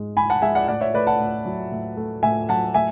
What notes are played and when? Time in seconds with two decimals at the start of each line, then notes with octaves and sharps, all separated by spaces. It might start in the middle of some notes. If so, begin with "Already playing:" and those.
Already playing: G#2 G#3
0.17 G#2 G#5 B5
0.30 F#5 A5
0.42 G#3 E5 G#5
0.55 D5 F#5
0.68 A2 D5 F#5
0.81 C#5 E5
0.94 A3 B4 D5
1.07 F#5 A5
1.20 A2
1.46 F#3
1.72 A2
1.97 A3
2.23 A2 E5 G#5
2.49 F#3 F#5 A5
2.74 A2 E5 G#5